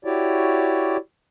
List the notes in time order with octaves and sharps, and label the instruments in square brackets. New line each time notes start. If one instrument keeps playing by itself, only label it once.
[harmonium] E4 F#4 G4 C#5 D5